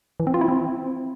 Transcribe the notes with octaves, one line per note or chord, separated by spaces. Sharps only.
E3
C4
F4
E4
C4